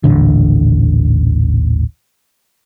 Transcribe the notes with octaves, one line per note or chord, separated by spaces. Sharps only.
D#1 A1 D3